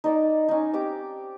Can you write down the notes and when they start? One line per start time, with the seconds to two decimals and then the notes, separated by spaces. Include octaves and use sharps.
0.04 D#4 D5 A5
0.49 C#4 D#4
0.74 C4 G4 G5 D6